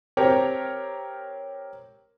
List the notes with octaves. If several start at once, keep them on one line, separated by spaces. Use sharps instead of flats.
C4 G4 A#4 C#5